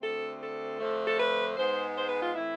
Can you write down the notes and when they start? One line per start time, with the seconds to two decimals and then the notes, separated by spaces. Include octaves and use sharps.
0.02 D2 D3 A3 C4 A4
0.41 A4
0.80 F2 D3 F3 A3
1.07 A4
1.19 B4
1.57 G#2 G#3 B3 C5
1.96 C5
2.08 B4
2.22 F4
2.34 A2 E3 A3 C4 E4